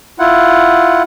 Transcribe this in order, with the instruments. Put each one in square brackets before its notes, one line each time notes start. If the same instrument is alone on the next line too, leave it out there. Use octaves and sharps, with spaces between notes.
[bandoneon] E4 F4 F#5